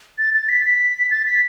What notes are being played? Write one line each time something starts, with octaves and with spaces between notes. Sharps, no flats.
A6
A6
B6
B6
A6
B6